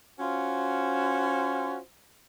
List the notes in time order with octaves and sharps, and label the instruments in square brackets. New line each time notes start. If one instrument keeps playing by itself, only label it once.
[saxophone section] C#4 F4 F#4 C5